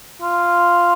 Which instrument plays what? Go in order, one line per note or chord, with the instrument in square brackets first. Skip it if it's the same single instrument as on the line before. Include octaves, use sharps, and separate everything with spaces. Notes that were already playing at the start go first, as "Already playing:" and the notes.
[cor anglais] F4